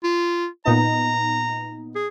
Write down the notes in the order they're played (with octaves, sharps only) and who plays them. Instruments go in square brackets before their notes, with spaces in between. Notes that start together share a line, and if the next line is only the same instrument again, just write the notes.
[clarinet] F4
[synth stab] A#2 B3 D#4 [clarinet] A#5
[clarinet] G#4